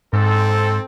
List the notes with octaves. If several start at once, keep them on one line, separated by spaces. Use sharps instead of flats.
G#2 C4 A4